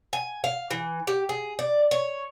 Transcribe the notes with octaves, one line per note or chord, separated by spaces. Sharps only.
G#5
F5
E3
G4
G#4
D5
C#5